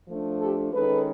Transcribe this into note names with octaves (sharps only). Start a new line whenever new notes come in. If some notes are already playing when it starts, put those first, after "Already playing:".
F3 A3 D4
G4 A4
D#3 G#3 C#4 A4 B4